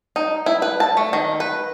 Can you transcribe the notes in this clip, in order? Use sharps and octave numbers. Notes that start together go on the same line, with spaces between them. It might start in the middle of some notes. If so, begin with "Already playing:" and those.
D#4
E4
B4
A5
A3
D#3
B4